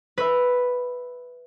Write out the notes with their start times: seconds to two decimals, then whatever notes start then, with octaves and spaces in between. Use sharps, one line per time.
0.18 B4 E5